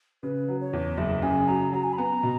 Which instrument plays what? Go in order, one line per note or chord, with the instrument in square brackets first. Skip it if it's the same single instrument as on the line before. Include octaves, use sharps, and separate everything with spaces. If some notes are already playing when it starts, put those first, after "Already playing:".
[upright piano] C#3 [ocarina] B4
[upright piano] F#3
[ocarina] C#5
[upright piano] E2
[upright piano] F#1 [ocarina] E5
[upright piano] C#3 [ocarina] G#5
[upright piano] F#3 [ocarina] A#5
[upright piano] F#3 [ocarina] A#5
[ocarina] G#5
B5
[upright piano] B3 [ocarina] A#5
[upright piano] B2